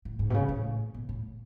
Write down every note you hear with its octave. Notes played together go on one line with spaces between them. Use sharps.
A2
G#2
B2
C#3
A2
B2
A2